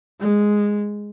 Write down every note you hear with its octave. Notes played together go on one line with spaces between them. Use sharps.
G#3